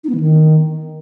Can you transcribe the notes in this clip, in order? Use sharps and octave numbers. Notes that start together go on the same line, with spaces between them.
D#4
B3
E3
D#3